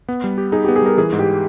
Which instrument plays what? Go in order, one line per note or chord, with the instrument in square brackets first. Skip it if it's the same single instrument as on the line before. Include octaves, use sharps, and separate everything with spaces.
[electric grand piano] B3
G3
G4
[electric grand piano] D#4 [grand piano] G#4
[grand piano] G4
[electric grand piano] B3
[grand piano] G#4
[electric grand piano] G3 [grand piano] A#4
[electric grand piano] E3 [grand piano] G#4
[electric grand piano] G#2
[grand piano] G4